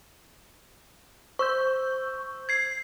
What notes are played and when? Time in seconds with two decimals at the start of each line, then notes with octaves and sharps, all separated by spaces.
1.39 C5 C#6 E6 G6
2.49 G#6 C7